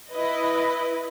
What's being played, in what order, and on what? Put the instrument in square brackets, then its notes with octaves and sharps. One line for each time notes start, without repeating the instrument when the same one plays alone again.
[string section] E4 B4 D#5